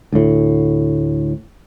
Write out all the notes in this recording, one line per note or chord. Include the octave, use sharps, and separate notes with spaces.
D2 A2